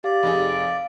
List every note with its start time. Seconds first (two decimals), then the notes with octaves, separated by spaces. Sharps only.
0.04 G4 D5 F5
0.23 F1 D#4 G#4
0.49 F5 D7